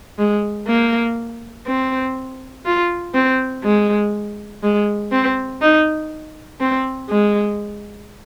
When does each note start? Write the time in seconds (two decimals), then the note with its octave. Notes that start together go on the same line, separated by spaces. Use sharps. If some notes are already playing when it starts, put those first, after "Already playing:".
0.18 G#3
0.68 A#3
1.67 C4
2.65 F4
3.14 C4
3.64 G#3
4.63 G#3
5.12 C4
5.61 D#4
6.60 C4
7.10 G#3